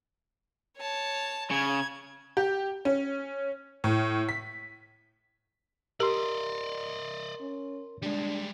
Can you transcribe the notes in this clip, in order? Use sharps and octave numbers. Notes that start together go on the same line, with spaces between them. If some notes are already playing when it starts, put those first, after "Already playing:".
C#5 A5
C#3 G#6
G4
C#4
A2
B6
G4 A#4 D5 D#5 C6
C#4
G3 G#3 D4